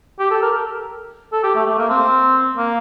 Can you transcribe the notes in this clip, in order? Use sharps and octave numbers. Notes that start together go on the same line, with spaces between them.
G4
A4
A#4
A4
G4
A3
A3
A#3
C4
A#3